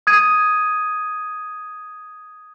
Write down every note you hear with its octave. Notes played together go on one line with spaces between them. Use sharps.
D#6 G#6 D#7